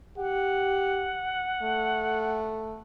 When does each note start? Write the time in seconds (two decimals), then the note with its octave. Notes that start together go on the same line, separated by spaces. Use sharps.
0.18 G4 F#5
1.62 A3